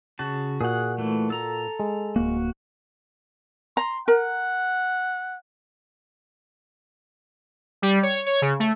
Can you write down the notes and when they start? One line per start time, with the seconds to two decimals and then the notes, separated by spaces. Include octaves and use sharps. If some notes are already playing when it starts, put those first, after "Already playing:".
0.19 C#3 F#4 A5
0.61 A#2 F#4 G#4 F#5
0.98 E3 A3
1.30 A4 A#5
1.80 G#3
2.16 D1 A#3 F#4
3.77 A#5 C6
4.08 A#4 F#5
7.82 G3
8.03 C#5
8.26 C#5
8.42 C#3
8.60 A3